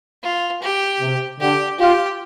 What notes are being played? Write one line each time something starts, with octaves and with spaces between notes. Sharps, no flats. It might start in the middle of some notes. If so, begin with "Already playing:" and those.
F4
G4
C3
D3 G4
F4 G4